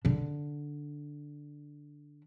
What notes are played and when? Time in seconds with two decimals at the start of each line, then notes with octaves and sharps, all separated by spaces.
0.05 D3 D4